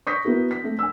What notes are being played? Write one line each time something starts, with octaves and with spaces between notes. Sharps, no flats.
C#6 D#6 G6 A#6 B6
B3 E4 F#4 A#4
B6
A3 C4
G#5 E6